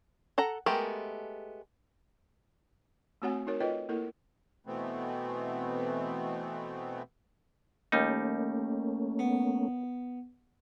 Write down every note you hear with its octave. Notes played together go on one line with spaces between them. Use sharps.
A4 F#5 A#5
G#3 A3 B3 G4 A#4
A3 C4 F#4 C#5 F#5 G#5
D#4 F#4 A#4 C#5
F4 A4 B4 C#5 D#5 G5
A#3 E4 A4 A#4
B2 E3 A3 B3 C4
D#2 G3 A3 A#3 C#4 D#4
B3